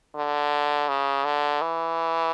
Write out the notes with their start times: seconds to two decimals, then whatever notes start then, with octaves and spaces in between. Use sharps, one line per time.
0.15 D3
0.89 C#3
1.25 D3
1.61 E3